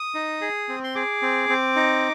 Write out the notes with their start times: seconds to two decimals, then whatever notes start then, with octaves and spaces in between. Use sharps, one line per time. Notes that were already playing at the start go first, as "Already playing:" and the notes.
Already playing: D#6
0.14 D#4
0.41 G#4
0.69 C4
0.84 C6
0.95 G#4 D6
1.22 C4
1.49 C4
1.76 D#4